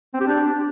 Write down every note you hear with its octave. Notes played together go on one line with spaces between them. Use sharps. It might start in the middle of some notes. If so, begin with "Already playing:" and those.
C4
G4
D4